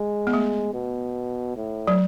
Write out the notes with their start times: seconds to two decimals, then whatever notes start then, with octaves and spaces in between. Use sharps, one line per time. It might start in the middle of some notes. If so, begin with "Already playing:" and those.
Already playing: G#3
0.27 B3
0.33 A3
0.74 B2
1.56 A2
1.87 F#3